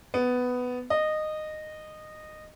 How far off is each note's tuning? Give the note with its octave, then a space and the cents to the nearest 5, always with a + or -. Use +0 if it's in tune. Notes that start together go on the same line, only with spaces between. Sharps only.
B3 +10
D#5 -15